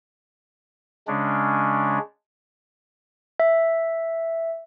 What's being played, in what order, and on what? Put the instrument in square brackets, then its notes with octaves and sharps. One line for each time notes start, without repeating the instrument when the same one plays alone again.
[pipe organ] C#3 G#3 C#4 D4
[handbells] E5